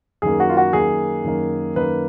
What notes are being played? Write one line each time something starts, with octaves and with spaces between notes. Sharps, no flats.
F#2 D#3 A#3 G#4
F#4
F4
F#4
F#2 D#3 A#3 G#4
F#2 D#3 A#3
F#2 D#3 A#3 B4